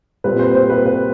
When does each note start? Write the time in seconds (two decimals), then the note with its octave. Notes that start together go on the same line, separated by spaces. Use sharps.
0.24 A#2 G3 C4 B4
0.39 C5
0.55 C5
0.70 B4
0.86 B4